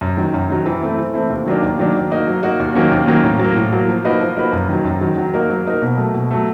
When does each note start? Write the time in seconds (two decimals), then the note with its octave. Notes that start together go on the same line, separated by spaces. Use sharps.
0.01 F#2
0.17 D#3 F#3
0.34 F#2
0.50 D#3 F#3
0.66 E3
0.82 A3 C4 E4
0.98 E3
1.14 A3 C4 E4
1.30 D#2
1.46 D#3 F#3 A#3 D4
1.63 D#2
1.79 D#3 F#3 A#3 D4
1.95 F#3
2.11 A#3 D#4 F#4
2.27 F#3
2.43 A#3 D#4 F#4
2.60 D#2
2.75 D#3 F#3 A#3 C#4
2.91 D#2
3.08 D#3 F#3 A#3 C#4
3.24 A2
3.39 F#3
3.44 A#3
3.56 A2
3.72 F#3 A#3
3.88 F3
4.04 A#3 D#4 F#4 B4
4.21 F3
4.36 A#3 D#4 F#4 B4
4.53 F#2
4.69 D#3 F#3
4.85 F#2
5.01 D#3 F#3
5.18 F#3
5.34 A#3 D#4 F#4 A#4
5.50 F#3
5.66 A#3 D#4 F#4 A#4
5.82 B2
5.98 F#3 A3
6.14 B2
6.31 F#3 A3